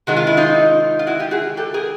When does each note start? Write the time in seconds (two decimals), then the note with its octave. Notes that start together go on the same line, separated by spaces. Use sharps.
0.07 C3 D#3 G#3 F#4
0.17 F4
0.27 E4
0.37 D#4 F4
0.99 F4
1.07 E4 F#4
1.19 F4 G4
1.31 F#4 G#4
1.57 G4 A4
1.74 G#4 A#4